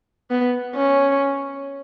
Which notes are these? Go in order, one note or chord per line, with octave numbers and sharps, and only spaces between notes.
B3
C#4